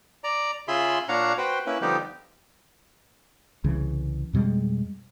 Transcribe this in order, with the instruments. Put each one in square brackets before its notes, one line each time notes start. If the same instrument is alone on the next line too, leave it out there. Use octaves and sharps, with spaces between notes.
[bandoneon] D5 A#5
C#3 F4 G#4 E5 B5 C6
A#2 D4 C#5 F5 F#5 A#5
F#4 B4 C5 G5
A#3 C#4 E4 B4
D3 F3 G3 B3 D#4 G4
[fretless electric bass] C2 C#3 E3
F2 B2 G3 G#3